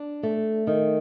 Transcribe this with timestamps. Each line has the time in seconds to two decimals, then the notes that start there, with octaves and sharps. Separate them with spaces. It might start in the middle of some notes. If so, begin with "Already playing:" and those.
Already playing: D4
0.23 A3
0.67 D#3